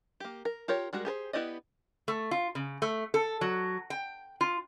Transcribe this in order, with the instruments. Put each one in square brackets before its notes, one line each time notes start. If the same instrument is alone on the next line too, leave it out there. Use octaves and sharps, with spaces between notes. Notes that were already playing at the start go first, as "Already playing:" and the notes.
[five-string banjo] A#3 G4
A#4
F4 G4 A#4 C#5
G3 G#3 F#4 A#4
G4 G#4 A#4 C5
B3 E4 G4 D5 D#5
[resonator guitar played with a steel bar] A3
F4
C#3
A3
A4
F#3
G5
F4